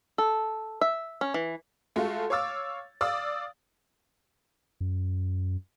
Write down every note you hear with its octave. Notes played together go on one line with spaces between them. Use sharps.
A4
E5
C#4
E3
G#3 A3 F4 F#4
C#5 F5 D6 E6 A6
D5 F5 D#6 E6
F#2